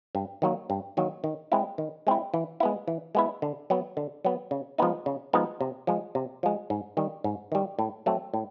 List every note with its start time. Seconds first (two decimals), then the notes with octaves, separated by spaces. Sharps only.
0.15 G2
0.42 D#3 F#3 A#3
0.70 G2
0.97 D#3 F#3 A#3
1.24 D#3
1.52 G#3 C4 E4
1.78 D#3
2.07 G#3 C4 E4
2.34 E3
2.60 G#3 B3 E4
2.88 E3
3.15 G#3 B3 E4
3.42 D3
3.70 F#3 B3
3.97 D3
4.25 F#3 B3
4.51 C#3
4.78 F3 G#3 B3 D#4
5.06 C#3
5.33 F3 G#3 B3 D#4
5.61 C3
5.87 F3 G#3
6.15 C3
6.43 F3 G#3
6.70 G#2
6.97 D#3 G3
7.24 G#2
7.52 D#3 G3
7.79 A2
8.06 F#3 A3 C4
8.34 A2